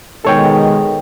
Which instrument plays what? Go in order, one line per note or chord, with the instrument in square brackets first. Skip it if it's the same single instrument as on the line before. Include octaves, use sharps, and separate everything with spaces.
[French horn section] B2 D#3 G#3 [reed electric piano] A4 C#5 G5